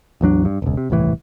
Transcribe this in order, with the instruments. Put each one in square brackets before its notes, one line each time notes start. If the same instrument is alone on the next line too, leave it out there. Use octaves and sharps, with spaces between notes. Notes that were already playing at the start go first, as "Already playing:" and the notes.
[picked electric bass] A1 E2 F#3 D4
G2
E1 C#2
C3
D#1 C2 A2 E3